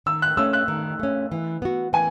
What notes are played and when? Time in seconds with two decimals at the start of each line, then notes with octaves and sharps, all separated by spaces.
0.06 D#3 E6
0.22 F#6
0.37 A3 C#4 E6
0.53 F#6
0.68 D#3
0.99 A3 C#4
1.32 E3
1.62 B3 F#4
1.93 E3 G#5